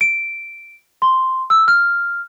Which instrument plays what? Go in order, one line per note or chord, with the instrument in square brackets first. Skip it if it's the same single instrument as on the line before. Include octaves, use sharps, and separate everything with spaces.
[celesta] D7
C6
E6
F6